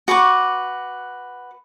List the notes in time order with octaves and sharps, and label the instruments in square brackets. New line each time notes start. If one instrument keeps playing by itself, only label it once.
[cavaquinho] F#4 B4 C#6 D6